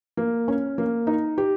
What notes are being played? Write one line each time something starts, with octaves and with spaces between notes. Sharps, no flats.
A#3
C#4
A#3
D#4
G4